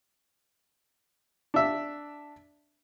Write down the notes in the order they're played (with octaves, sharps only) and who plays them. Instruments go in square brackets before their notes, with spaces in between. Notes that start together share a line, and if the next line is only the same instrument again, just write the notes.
[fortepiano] D4 E5